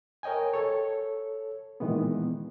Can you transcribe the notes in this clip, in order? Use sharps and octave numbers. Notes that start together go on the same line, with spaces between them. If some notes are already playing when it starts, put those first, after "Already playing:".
A#4 C#5 D#5 G5 G#5
A4 C#5
A#2 D#3 E3 G#3 B3